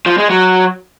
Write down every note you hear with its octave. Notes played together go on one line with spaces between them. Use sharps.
F3
G#3
F#3